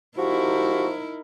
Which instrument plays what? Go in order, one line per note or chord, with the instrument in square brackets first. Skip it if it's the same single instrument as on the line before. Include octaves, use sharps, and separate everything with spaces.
[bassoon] F3 [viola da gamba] D#4 E4 A#4 [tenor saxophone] F#4 [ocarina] G4